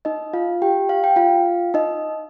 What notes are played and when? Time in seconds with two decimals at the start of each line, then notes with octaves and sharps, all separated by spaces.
0.05 D#4 D#5
0.33 F4 F5
0.62 G4 G5
0.89 F5
1.04 G5
1.16 F4 F5
1.74 D#4 D#5